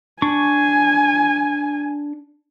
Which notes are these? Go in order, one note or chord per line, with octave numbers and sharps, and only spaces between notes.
D4 G#5 C#6